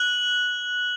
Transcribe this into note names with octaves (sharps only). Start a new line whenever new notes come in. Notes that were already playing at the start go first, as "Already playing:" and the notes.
Already playing: F#6 F#7